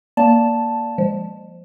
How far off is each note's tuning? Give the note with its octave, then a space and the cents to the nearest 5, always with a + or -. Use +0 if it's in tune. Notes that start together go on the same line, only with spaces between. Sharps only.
A#3 +0 D5 -15 A5 +0
F3 +0 G#3 -30